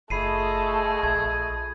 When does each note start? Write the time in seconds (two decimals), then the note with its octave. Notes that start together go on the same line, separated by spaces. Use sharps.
0.10 F#1 A3 F4 G#4 D#5 B5 C7 D#7
1.03 A#1 G#6